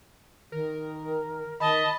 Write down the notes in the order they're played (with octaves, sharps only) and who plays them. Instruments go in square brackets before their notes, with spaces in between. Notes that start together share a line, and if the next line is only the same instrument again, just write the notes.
[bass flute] D#3 [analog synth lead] A#4
[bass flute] D#3 [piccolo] D#5 [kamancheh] A5 [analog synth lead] B5